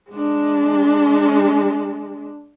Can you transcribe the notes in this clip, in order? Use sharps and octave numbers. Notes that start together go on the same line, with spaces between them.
G#3 D4